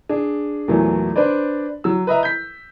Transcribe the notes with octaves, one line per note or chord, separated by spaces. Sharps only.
D4 G#4
E2 A#2 F#3 A3
D4 B4 C5 D5
F#3 E6
B4 D#5 E5 A#5
G6 B6